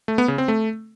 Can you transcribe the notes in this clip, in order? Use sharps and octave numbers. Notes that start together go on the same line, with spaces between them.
A3
B3
C#3
C4
A3